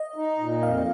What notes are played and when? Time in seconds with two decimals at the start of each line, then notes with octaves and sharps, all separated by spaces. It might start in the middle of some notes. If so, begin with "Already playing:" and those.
Already playing: D#5
0.16 D#4
0.39 A#2
0.62 F2 F5